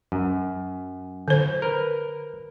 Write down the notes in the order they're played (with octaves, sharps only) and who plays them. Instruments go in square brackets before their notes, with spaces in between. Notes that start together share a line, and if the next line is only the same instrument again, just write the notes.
[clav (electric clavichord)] F#2
[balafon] D3 C5
[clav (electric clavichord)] A#4 B4